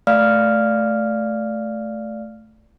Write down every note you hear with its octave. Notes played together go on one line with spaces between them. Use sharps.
A3 D5 F5 F6